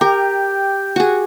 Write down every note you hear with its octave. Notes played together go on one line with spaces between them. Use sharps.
G4 A#4 G5
F#4 G#4